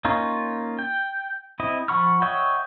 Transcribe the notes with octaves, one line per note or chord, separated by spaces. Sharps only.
A#3 C#4 D#4 F4 C#5
G5
C4 E4 D#5
F3 F#5 B5 C#6 F6
C#5 D#5 E5 F#5 G5